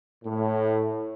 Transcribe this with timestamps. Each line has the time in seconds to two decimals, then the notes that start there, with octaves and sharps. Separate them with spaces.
0.24 A2